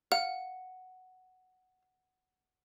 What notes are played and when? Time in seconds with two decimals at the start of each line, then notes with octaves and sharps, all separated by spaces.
0.12 F5 F#5